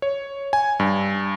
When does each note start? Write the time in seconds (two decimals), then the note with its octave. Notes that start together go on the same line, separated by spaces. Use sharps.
0.02 C#5
0.53 G#5
0.80 G2